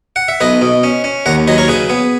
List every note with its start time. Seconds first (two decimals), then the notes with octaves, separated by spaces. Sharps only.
0.16 F#5
0.28 E5
0.40 B1 B4 D#5
0.62 B2
0.83 C#4
1.04 C#4
1.26 D#2 F#5 A#5
1.48 F#3 B4 D#5
1.58 A#4 C#5
1.68 C#3 G#4 B4
1.90 B3